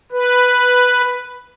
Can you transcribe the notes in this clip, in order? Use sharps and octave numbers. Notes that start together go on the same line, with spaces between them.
B4